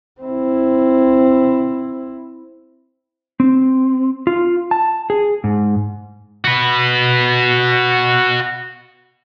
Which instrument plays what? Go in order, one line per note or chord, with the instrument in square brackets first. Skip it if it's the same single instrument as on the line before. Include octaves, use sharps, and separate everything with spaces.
[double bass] C4 E4
[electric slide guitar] C4
F4
A5
G#4
G#2
[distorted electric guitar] F#4 B4